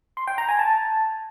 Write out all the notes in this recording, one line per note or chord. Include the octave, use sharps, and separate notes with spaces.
C6
G5
A#5
G#5
A5